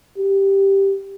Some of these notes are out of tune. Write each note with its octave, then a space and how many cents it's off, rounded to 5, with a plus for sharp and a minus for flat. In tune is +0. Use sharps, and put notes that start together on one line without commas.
G4 +0